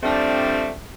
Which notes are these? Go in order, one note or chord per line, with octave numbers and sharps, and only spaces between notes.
F3 G3 A3 C4 D4